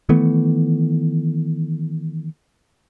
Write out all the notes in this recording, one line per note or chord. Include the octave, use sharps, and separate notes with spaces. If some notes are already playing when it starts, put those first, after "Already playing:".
D#3 E3 A3 B3